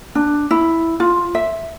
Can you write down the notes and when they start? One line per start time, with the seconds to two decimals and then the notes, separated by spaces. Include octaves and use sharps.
0.15 D4
0.51 E4
1.00 F4
1.35 E5